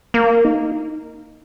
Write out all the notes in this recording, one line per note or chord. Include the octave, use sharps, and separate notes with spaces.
A#3
D#4